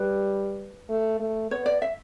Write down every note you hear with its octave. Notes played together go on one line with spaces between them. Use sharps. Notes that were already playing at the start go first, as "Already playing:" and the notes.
Already playing: G3 B4
A3
A3
B3 C#5
D5
E5